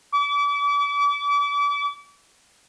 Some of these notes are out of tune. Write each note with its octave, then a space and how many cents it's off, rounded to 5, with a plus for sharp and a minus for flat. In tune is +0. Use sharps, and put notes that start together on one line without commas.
D6 -35